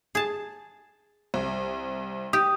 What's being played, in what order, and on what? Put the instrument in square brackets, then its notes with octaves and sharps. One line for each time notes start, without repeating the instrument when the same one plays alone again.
[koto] G#4 A5
[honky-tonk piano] C2
[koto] G4 [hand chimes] D#6